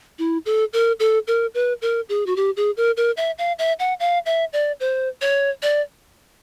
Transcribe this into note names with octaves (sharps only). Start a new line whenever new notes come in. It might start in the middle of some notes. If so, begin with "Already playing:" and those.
E4
A4
A#4
A4
A#4
B4
A#4
G#4
F#4
G4
G#4
A#4
A#4
E5
F5
E5
F#5
F5
E5
D5
C5
C#5
D5